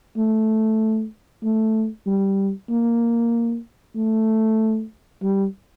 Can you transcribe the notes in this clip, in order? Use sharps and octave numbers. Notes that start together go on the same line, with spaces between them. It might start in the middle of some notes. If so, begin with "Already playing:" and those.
A3
A3
G3
A#3
A3
G3